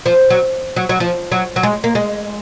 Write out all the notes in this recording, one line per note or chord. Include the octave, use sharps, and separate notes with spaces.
F3
F#3
F#3
F#3
F3
F#3
F#3
G#3
A#3
G#3